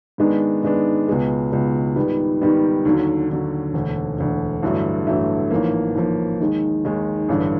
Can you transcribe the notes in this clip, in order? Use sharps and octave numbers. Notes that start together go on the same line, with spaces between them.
G#2 D#3 G#3 B3 D4
G#2 D#3 G#3 B3 D4
C#2 B2 G#3 B3
C#2 B2 G#3 B3
G#2 D#3 G3 B3
G#2 D#3 G3 B3
D#2 D3 F#3
D#2 D3 F#3
E1 D2 D3
E1 D2 D3
A1 G2 D3 F#3 A3
A1 G2 D3 F#3 A3
A1 G#2 F3 A#3
A1 G#2 F3 A#3
D#2 D#3 G#3
D#2 D#3 G#3
A1 G2 D3